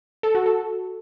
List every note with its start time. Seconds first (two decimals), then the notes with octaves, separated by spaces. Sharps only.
0.23 A4
0.35 F#4
0.46 A4